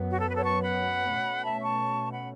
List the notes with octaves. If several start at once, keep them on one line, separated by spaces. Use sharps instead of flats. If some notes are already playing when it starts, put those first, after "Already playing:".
Already playing: F#2 F#3 B3
F#4
A4
B4
A4 C#5
A5 C#6
F#5 B5
B2 A3 C#4
E5 A5
A5 C#6
F#5 B5